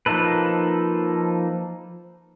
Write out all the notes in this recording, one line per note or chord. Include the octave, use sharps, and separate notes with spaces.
F3 A#3 D#4 A4 B4